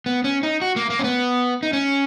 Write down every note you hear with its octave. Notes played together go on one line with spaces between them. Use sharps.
B3
C#4
D#4
F#4
A#3
A#3
C#4
B3
D#4
C#4